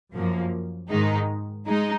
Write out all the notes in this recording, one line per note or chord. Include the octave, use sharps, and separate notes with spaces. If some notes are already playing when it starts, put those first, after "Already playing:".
F#2 F3 A#3
G#2 D#3 G#3 D#4
G#3 D#4